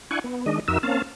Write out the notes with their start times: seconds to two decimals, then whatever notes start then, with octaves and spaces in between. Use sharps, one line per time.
0.11 D4 E4 F#5 G#5 C#6
0.24 B3
0.46 D#3 G#3 D4 D#5
0.68 F2 D#4 F#4 A#4 E5 E6
0.83 A#3 C4 C#4 F5 A5